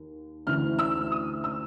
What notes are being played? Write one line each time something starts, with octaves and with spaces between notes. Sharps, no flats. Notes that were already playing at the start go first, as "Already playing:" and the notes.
Already playing: D#2
D2 C#3 E3 F6
E6
D#6
E6